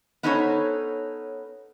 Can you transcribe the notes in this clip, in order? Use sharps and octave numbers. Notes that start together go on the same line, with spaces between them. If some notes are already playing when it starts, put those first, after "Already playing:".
B3 C#4 D#4 A4 C5 C#5